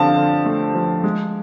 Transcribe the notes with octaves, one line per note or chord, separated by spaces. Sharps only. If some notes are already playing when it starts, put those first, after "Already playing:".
Already playing: D3 F3 C4 F5 A5
D3
A3
F3
G#3